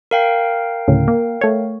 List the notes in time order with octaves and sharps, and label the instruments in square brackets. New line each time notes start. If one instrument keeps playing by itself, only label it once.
[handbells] A#4 F5 G5
[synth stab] D2 A2 C#3
A#3
A3 C#5